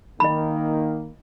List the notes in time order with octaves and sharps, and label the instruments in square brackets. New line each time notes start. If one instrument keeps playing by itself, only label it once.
[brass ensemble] D#3 A#3 [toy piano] D#5 B5